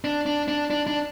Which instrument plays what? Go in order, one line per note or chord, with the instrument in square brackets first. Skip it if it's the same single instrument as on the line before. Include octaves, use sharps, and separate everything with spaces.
[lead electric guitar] D4
D4
D4
D4
D4